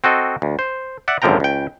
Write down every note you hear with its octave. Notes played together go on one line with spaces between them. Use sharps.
C4 F#4 A4 D#5
D2
C5
D5 E5 F#5
G#1 F#2 D3 F3 G5 A#5
C#2 G5